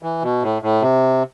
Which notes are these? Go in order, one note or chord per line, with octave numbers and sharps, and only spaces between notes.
E3
B2
A2
A2
C3